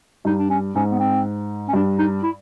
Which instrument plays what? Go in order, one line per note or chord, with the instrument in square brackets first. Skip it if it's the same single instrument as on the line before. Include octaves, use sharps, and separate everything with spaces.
[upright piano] G2 [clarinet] D#4
[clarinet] D4
C#4
[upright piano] G#2 [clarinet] C#4
[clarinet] B3
C4
C#4
[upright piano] G2 [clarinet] D4
[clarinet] D#4
E4